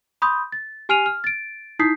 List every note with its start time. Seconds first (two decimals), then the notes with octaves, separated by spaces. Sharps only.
0.22 B5 C6 D#6 G6
0.52 A6
0.89 G4 G#5 F6 C7 D#7 F7
1.06 F6
1.24 A6 D7
1.79 D#4 E4 D#6 G6 B6 C7